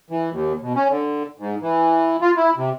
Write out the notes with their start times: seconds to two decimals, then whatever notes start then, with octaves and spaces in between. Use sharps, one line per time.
0.10 E3
0.31 D#2
0.62 B2
0.75 C#4
0.90 D3
1.39 G#2
1.62 E3
2.21 F4
2.37 E4
2.57 C3